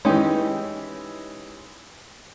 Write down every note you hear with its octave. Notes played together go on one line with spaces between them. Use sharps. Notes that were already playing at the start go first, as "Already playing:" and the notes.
E3 G#3 C#4 D#4 G4